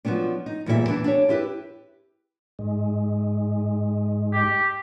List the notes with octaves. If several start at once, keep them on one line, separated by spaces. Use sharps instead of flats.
F3 F#3 A3 B3 D4
D#4
E2 A#2 G3 A4 E5
E3 B3 D4
D4 G4 C#5
E4 G4 B4
G#2 G#3
G4